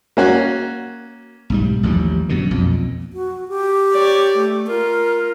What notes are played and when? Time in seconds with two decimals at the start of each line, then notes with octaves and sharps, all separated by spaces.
0.17 A#3 C#4 F#4
1.50 B1 G#2 G3
1.83 A1 D#2 F3 G3
2.29 F#2 B2 D3
2.51 B1 F2 A#2
3.13 F#4
3.48 G4
3.92 C#5 D5
4.36 A3
4.67 F4 A#4